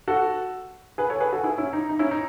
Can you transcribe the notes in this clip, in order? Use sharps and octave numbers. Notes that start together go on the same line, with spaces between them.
F#4 A4
G#4 B4
A4 C#5
G#4 B4
F#4 A4
E4 G#4
C#4 E4
D#4
D#4
C#4 E4
D#4